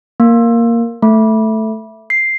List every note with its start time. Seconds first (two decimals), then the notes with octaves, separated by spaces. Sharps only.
0.20 A#3
1.03 A3
2.10 C7